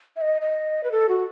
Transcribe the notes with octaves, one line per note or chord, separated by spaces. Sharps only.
E5
D#5
D#5
B4
A4
F#4